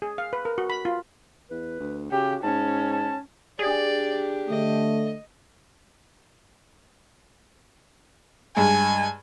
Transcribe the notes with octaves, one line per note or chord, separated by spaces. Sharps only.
G#4
F5
B4
A#4
F#4
B5
F4
E2 B4
D2
C#3 F#4 G4
G#2 C#4 A5
A5
D4 G4 G#4 D5
D3 A3 D#5
G2 G#3 G#5